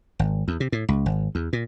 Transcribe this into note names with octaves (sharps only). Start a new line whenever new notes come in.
G#1
E2
C3
A2
C#2
G#1
E2
A#2